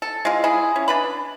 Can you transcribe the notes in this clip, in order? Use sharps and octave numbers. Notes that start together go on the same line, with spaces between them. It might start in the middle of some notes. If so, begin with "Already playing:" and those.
A4
G#3 F4
E4 G#4
C#4
D4 B4 B5